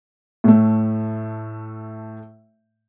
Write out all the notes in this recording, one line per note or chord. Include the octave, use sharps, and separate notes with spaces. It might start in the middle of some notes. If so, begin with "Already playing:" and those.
A2 A3